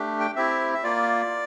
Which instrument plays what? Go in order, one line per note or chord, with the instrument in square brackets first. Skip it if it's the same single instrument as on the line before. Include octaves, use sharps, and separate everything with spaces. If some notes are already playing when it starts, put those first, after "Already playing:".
Already playing: [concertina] A3 D4 G4
G5
C4 E4 G4 E5
E5
A#3 F4 D5